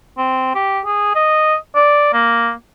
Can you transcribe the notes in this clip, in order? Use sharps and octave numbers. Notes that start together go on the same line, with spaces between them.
C4
G4
G#4
D#5
D5
A#3